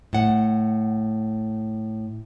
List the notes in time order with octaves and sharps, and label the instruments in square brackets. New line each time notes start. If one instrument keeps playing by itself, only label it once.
[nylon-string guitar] A2 F#5